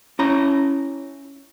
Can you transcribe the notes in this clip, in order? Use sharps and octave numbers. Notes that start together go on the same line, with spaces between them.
C#4 E4 A#5